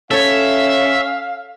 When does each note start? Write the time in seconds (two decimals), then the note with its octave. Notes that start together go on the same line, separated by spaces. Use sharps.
0.11 C#4 A4 C#5 E5 F5